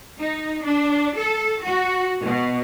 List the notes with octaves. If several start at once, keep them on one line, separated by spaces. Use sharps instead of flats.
D#4
D4
A4
F#4
B2